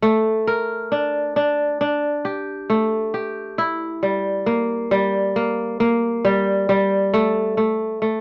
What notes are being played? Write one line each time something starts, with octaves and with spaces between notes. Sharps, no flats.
A3
A#4
D4
D4
D4
G4
A3
G4
E4
G3
A#3
G3
A#3
A#3
G3
G3
A3
A3
A3